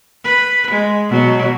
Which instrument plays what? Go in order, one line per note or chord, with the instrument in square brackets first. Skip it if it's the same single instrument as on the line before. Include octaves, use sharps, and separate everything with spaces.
[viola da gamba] B4
G#3
B2 F#3